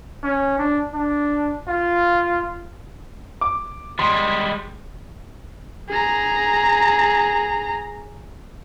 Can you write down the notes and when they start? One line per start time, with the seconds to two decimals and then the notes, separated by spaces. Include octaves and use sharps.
0.23 C#4
0.58 D4
0.94 D4
1.68 F4
3.41 D6
3.99 G3 G#3 C6
5.89 G#4 A#5